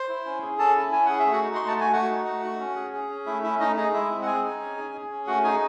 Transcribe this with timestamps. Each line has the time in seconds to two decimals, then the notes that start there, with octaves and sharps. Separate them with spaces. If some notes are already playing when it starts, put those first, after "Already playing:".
Already playing: C5 C6
0.09 E4
0.26 C#4
0.42 G#4
0.58 C#4 A4 A5
0.76 E4
0.92 C#4 G#5
1.06 G#4 F#5
1.19 E5
1.26 A3
1.32 F#4 F#5
1.43 D#4
1.55 A3 C6
1.68 A5
1.76 F#4 G#5
1.93 A3 F#4 F#5
2.09 D#4
2.26 A3
2.43 F#4
2.59 C#4
2.76 G#4
2.93 G#4
3.10 C#4
3.26 A3 E4 E5
3.43 C#4 E4 E5
3.60 A3 D#4 D#5
3.76 D#4 G#4 D#5
3.93 G#3 E4 E5
4.10 C4
4.22 F#5
4.26 G#4 G#5
4.43 D#4
4.60 C#4
4.77 G#4
4.94 G#4
5.11 C#4
5.27 A3 F#4 F#5
5.44 D#4 G#4 G#5